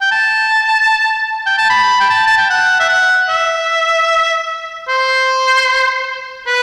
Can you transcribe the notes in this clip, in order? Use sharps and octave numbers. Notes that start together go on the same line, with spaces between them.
G5
A5
G5
A5
B5
G5
A5
A5
G5
F#5
E5
F#5
E5
C5
B4